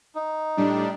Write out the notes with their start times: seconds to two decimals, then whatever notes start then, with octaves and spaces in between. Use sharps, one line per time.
0.15 D#4
0.57 A2 G3 D4